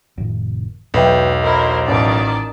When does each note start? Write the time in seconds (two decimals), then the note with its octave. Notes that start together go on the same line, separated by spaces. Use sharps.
0.18 F1 A2 D#3
0.94 B1 E2 B2 F#3 B4 E5 G5
1.43 E4 A#4 C5 D#5 B5
1.88 A1 D#3 D5 A5